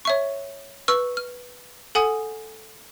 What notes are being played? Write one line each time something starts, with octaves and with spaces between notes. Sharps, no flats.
C#5 E5 C#6
B4 C#6 E6 F6
F6
A4 F#5 G#5 D#6